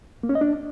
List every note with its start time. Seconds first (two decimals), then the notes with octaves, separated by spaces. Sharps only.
0.23 A#3
0.29 C#4
0.35 D#5
0.41 D4